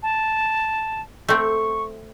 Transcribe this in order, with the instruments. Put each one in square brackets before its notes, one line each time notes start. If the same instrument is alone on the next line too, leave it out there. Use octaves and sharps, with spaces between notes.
[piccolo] A5
[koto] A3 C4 [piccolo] C#6